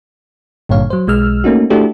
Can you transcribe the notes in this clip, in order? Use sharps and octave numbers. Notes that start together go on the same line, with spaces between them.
G#1 G2 A#2 D3 C#5 F5
F#3 C5
B1 G#3 E6 F6
A3 A#3 C#4 D#4 F#4
A3 D4 E4 F#4 G4 A4